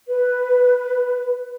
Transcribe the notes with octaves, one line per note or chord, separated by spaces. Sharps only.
B4